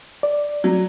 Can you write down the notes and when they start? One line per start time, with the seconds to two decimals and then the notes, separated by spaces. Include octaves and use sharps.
0.23 D5
0.64 F#3